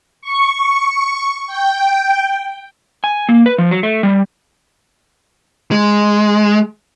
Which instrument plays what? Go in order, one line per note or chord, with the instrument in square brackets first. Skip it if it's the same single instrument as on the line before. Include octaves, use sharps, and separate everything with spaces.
[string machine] C#6
G5
[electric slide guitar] G#5
A#3
B4
F3
F#3
A3
G3
[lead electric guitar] G#3